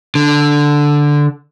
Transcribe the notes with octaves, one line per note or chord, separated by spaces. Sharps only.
D3